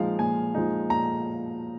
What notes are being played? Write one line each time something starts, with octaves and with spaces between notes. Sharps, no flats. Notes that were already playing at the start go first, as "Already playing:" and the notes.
Already playing: A#2 F3 G#3 D#4 F5
A#2 G#5
F3 G#3 D#4
A#2 A#5